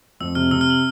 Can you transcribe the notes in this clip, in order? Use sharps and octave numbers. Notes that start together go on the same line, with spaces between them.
F2 E6
C3 F6
C3 E6
F6
E6